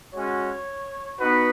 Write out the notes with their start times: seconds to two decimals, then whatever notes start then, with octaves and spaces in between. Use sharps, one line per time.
0.14 G#3 C#4 F#4 C#5
1.18 B3 D#4 F#4 B4